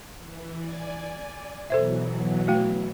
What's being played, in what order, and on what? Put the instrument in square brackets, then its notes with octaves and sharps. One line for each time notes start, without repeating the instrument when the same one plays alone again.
[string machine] E3
D5 G#5
[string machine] B2 E3 F#3 [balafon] A4 C5 E5
[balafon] A3 F#4 G5